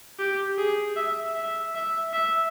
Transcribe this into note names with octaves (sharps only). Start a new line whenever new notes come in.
G4
G#4
E5
E5
E5
E5